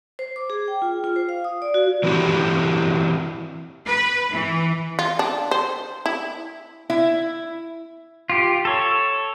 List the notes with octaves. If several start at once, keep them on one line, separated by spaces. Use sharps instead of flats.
C5
D6
G#4
G5
F4
F4
C5
F5
D#6
D5
F#4
E3 F#3 C4 E4 F#4 G4
B4
E3
F4
D4
C5
E4
E4
F4 G4
A4 C#5